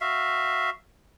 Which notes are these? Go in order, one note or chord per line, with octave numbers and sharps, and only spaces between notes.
F#4 E5 F5